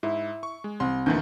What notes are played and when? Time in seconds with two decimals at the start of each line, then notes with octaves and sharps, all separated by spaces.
0.03 G#2 E4
0.43 C#6
0.64 G#3
0.80 C2 C6
1.06 D2 A#2 D#3 E3 G6